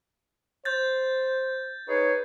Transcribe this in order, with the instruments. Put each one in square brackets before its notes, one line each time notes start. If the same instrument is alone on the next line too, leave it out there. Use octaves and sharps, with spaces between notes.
[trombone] C5 [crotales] G6 A6
[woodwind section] D#4 G#4 C#5 [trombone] B4